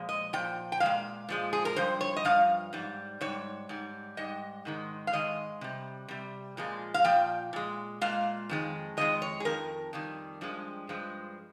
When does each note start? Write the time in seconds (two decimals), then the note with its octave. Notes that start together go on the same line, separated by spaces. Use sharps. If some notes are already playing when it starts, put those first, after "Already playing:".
Already playing: A#2 F3 G#3
0.09 D#5
0.33 A#2 F3 G5
0.72 G5
0.80 F3 G#3 F5
0.86 A#2
1.29 A#2 F3 G#3
1.53 G#4
1.65 A#4
1.76 G2 F3 C5
2.01 C#5
2.16 D#5
2.25 G2 F3 F5
2.73 G#2 G3
3.21 G#2 G3 C#5
3.69 G#2 G3
4.17 G#2 G3 D#5
4.65 G#2 D#3 G#3
5.07 F5
5.13 G#2 D#3 G#3 D#5
5.61 C3 G3
6.08 C3 G3
6.57 A#2 F3 G#3
6.94 F5
7.04 A#2 F3 G5
7.53 A#2 G#3
8.01 A#2 G#3 F5
8.49 F2 D#3 G#3
8.97 F2 D#3 G#3 D#5
9.22 C#5
9.40 G#4
9.45 F2 D#3 A#4
9.93 F2 D#3 G3
10.41 G2 F3 G#3
10.89 G2 F3 G#3